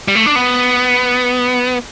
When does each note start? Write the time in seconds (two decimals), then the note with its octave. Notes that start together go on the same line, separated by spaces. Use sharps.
0.08 G3
0.15 A3
0.26 D4
0.36 B3